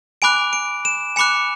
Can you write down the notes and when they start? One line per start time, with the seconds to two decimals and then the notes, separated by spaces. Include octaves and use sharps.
0.22 G#5 B5 D6 F#6 D7
0.53 D7
0.85 E7
1.16 G#5 B5 D6 F#6 C#7